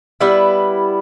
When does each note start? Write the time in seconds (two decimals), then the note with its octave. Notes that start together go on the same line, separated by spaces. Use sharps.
0.21 G3 B3 E4 B4